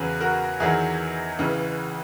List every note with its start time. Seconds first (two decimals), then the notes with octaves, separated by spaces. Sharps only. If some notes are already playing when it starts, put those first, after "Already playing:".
Already playing: E2 C#3 F#3 G#4 B4
0.20 F#4 A#4
0.60 E2 D#3 F#3 E4 G#4
1.39 C#2 C#3 E3